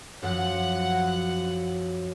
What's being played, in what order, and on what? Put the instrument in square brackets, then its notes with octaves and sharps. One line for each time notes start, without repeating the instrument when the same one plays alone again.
[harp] F#2 F3 [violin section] F#5